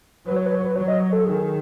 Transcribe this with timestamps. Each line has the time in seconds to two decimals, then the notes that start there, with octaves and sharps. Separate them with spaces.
0.26 F#3 B4
0.36 C#5
0.46 B4
0.55 C#5
0.65 B4
0.76 F#3 C#5
0.88 D#5
1.00 C#5
1.13 A4
1.25 D#3 G#4